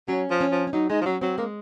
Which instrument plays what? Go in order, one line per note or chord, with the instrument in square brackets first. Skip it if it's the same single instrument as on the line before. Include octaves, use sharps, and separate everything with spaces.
[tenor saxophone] F#3 [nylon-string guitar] C#4
[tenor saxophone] F3
[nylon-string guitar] C#4
[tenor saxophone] F3
[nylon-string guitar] C#4
[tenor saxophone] F#3 [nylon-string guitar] D#4
[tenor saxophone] G#3 [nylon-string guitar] D#4
[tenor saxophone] F3
[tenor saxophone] F#3 [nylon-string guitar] C#4
[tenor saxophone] F#3 [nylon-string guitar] C4
[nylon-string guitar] G#3 [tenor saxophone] A#3